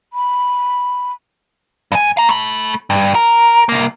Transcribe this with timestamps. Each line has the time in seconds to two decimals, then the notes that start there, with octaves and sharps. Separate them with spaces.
0.13 B5
1.92 G2 G#5
2.17 F5 A#5
2.29 A3 B5
2.90 G2
3.15 A#4
3.69 C2 A#3